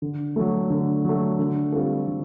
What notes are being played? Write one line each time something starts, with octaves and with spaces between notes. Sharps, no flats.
D3
F#3 A3
D3
F#3 A3
D3
G3 C4 F4 A4
D3